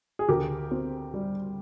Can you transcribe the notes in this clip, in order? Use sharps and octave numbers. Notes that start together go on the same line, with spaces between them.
G#4
D2 G4 A#4
C4
G3